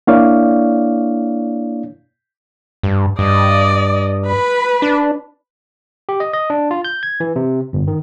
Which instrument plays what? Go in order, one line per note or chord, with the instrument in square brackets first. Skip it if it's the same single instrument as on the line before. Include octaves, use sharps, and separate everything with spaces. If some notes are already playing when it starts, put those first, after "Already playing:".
[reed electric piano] A#3 D4 E4 C#5 D5 F5
[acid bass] G2
[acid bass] G2 [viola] D5 D#5
[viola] B4 B5
[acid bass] D4
[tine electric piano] G4
D#5
D#5
D4
F4
G6
G#6
E3
C3
G1
D#3